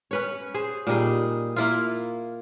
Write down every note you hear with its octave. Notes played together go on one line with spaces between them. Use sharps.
C#4 B4 C#5
G#4 C5
A#2 G3 D#4 G#4
A#3 E4 F4